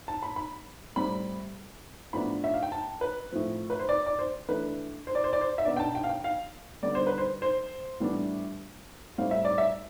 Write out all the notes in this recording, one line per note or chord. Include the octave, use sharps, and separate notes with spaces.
A5
B5
B5
A2 G3 C4 B5
A2 F3 B3 D4 B5
E5
F5
G5
A5
B4
A2 F3 C4
B4
C5
D5
D5
C5
E3 A3 D4 B4
C5
D5
C5
D5
C5
E5
B2 B3 D4 D5
G5
A5
G5
F5
G5
F5
D3 G3 B3 D5
C5
B4
C5
C5
A2 E3 G3 B3 D4
A2 G3 C4 F5
E5
D5
E5